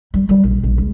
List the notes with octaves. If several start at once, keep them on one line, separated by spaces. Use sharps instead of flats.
G3
G3
A#1
A#1
C#2